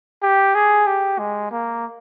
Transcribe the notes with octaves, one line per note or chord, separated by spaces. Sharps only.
G4
G#4
G4
G#3
A#3